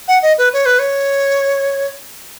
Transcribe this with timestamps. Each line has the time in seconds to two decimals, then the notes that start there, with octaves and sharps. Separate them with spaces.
0.08 F#5
0.23 D#5
0.38 B4
0.53 C#5
0.66 B4
0.79 C#5